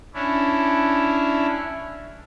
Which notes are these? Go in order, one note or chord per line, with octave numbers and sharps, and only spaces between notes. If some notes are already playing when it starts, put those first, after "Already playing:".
C#4 D4 E4